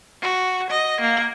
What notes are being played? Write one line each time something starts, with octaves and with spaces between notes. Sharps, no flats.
F#4
D#5
A#3